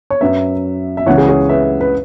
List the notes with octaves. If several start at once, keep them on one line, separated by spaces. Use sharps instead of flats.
C#5
F#2 F#3 B4 E5
E5
C#2 C#3 E3 C#5 F#5
G#4
G#4 C#5
B4 E5
B4